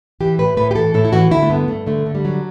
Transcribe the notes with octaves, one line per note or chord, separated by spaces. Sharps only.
E3 G4
A2 B4
A2 B4
G4
E3 A4
A2 A4
E4
E3 F#4
D3 E4
A3
G2 B3
G2 A3
D3 A3
D3
G3
F#3